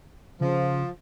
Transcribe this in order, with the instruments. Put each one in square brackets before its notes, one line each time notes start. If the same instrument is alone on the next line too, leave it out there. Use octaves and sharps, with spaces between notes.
[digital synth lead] C#3 [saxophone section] F3